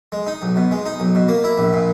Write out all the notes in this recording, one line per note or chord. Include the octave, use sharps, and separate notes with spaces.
G#3
D#4
B1
B2
G#3
D#4
B1
B2
A#3
E4
A#1
A#2